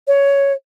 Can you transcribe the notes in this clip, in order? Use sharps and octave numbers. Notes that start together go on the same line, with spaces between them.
C#5